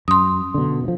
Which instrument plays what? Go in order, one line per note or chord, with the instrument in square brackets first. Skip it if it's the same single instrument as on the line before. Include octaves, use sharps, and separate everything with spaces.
[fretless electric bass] F#2 [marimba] C6 D#6
[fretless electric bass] B2 D3
G2 F3